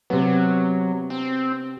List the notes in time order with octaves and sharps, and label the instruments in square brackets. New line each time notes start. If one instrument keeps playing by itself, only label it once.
[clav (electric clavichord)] C3 B3 [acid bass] F#3
[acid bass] C4